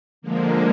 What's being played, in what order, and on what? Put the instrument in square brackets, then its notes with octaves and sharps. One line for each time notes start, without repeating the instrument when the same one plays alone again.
[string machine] D3 F3 G#3 A#3